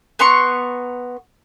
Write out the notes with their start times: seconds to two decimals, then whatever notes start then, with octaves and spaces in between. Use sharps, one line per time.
0.19 B3 A#5 C6 C#6